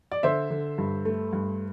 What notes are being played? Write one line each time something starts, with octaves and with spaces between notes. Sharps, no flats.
D5
D3 C5 E5
D3
G2
A3
G2